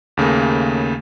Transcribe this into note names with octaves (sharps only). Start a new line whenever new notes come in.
D#2 C#3 A3 A#3